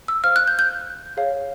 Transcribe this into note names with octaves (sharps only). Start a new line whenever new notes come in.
E6
C5 F5 F6
F#6
G6
G6
G#4 C#5 F5